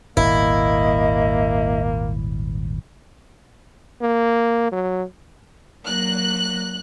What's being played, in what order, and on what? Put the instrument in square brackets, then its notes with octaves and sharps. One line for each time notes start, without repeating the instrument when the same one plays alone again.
[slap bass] D#1 G#1 [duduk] A#3 [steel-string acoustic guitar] E4 [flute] D#5
[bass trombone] A#3
F#3
[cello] F#3 A#3 [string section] F#6